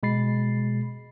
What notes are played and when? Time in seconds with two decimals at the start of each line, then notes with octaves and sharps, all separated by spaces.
0.03 B2 G#3 B5 A6 C7